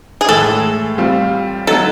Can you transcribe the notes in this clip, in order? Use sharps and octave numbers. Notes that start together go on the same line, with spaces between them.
G#4
A2 E3 G#3 A4
G3 C4 F4
D3 F#3 B3 D#4 A4